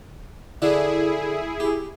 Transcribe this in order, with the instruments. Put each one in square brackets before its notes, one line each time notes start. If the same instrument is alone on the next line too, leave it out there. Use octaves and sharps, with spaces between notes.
[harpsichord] D3 D4 A4 [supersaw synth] E4 G#4
[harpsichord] G4